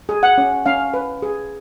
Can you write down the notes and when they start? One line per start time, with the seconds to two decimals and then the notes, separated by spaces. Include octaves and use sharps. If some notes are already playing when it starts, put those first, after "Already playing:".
0.09 G#4
0.23 F#5
0.38 C#4
0.66 C#4 F5
0.94 B4
1.22 G#4